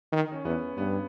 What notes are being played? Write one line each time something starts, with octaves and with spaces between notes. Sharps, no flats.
D#3
C#4
E2 B3
G2 B3